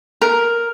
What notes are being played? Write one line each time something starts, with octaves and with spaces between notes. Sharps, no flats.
A#4